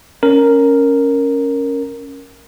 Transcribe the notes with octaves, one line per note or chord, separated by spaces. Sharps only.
C#4 A#4